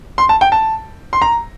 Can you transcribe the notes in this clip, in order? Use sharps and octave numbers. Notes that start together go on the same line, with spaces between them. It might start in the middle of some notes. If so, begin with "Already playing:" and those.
C6
A5
G5
A5
C6
A#5